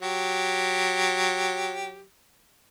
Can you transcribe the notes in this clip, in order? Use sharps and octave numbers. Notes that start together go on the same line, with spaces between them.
F#3 G4